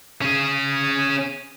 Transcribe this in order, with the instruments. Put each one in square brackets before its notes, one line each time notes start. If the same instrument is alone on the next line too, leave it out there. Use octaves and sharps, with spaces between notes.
[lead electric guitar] C#4 G#4